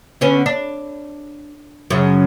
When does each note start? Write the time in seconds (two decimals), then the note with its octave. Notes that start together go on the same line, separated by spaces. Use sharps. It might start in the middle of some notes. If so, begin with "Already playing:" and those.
0.21 D3 B3 C#4
0.46 D4
1.90 F#2 C#3